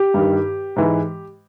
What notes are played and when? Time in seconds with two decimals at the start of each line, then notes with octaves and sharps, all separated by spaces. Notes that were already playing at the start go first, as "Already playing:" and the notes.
Already playing: G4
0.14 G2 D#3 G3
0.76 G#2 E3 G#3